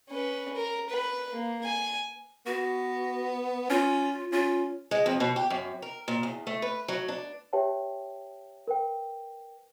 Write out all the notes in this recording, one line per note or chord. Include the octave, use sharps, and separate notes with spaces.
C#4 B4
A#4
B4
A#3
G#5
B3 F#4
C#4 F4
C#4 F4
G#3
F2
B2
G4
F#2
A#4
A#2
E2
A3
B4
F#3
D4
G4 B4 C#5 E5 G5 A5
A#4 B4 G5